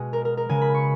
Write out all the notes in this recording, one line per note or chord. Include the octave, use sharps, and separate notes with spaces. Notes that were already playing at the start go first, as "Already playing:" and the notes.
Already playing: B2 G#3 F#4 G#4
A#4
A#4
A#4
C#3 G#3 G#5
B5
C#6